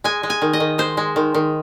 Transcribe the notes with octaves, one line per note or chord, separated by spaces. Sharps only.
G#3 G#5
G#3
G#5
D#3
D#5
D#3
G#3 C5
G#3
D#3
D#3